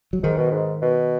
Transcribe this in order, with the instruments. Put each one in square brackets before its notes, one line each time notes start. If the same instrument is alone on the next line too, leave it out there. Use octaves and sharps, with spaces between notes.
[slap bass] F#3
[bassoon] G#2 [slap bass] D#3
[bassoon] B2
G#2
B2